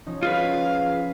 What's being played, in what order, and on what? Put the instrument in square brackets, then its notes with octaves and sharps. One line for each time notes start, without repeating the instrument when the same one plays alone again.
[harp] F3 C#4 D#4
[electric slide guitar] F4 G#4 B4 [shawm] F5